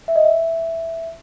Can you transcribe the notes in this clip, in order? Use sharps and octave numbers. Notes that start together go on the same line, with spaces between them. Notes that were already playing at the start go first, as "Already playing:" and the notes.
E5
D#5
E5